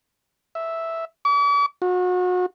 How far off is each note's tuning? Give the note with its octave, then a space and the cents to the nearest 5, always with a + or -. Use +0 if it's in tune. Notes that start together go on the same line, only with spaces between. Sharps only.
E5 -5
D6 -45
F#4 -35